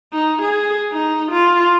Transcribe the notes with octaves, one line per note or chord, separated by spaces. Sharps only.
D#4
G#4
D#4
F4